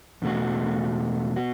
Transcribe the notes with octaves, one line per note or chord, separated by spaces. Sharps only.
E2 B2 A3 F#4
B3 F#4